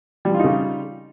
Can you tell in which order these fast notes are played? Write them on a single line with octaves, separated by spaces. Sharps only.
G3 F3 F4 D#4 C#3